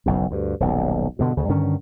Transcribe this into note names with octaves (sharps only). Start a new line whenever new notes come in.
F#1 B1 F#2
D2 G2
D#1 B1
G2 B2 D3
D2 C#3
G2 D3 D#3 C#4